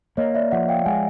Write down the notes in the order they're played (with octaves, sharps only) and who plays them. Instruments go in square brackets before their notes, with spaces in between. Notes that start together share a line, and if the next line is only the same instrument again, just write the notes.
[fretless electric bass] A#3 [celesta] C#5 D#5
[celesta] D5 E5
[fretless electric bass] F3 [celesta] E5 F#5
[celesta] F5 G5
[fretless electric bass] G#3 [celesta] F#5 G#5